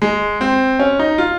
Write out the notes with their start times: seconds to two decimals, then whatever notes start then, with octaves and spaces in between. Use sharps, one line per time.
0.02 G#3
0.41 C4
0.79 C#4
0.99 D#4
1.18 F4